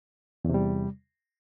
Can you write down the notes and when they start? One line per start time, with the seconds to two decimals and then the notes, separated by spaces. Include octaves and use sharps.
0.45 E2
0.49 C3
0.54 G3